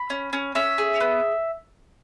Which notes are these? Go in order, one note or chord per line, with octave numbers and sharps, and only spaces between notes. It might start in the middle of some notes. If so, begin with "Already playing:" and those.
Already playing: B5
C#4
C#4
C#4 E5
G#4
B3